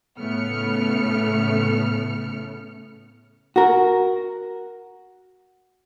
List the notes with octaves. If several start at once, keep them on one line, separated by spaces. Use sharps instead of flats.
A2 C#3 A3 B3 F6 C#7
F#4 A#4